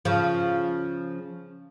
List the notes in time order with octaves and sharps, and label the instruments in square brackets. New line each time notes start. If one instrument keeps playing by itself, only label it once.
[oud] C#3 F3